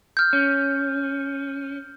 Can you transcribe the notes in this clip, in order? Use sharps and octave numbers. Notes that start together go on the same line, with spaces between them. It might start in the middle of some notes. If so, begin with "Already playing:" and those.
F6 G6
C#4